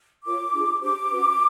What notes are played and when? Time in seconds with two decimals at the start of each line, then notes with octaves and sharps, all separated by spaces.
0.24 F4 A#4 C#5 D6
0.53 D4 F4 G#4
0.81 D4 G4 C5 D6
1.10 C#4 F#4 B4